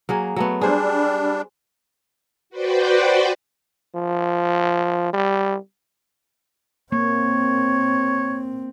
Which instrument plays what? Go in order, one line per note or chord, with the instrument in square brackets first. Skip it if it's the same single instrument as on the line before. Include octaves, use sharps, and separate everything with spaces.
[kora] F#3 A#3 G#4
F#3 A3 B3
[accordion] G3 D4 [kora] G#4 C5
[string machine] F#4 B4 C5 D5 G5
[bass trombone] F3
G3
[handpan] A#3 [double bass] C4 [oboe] C#5